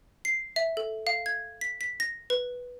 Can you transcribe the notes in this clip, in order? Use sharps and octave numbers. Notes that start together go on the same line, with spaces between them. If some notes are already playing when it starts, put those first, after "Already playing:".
C7
E5
A4
F5
G#6
B6
B6
A#6
B4